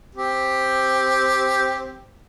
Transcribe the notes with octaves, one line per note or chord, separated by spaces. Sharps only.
C4 G4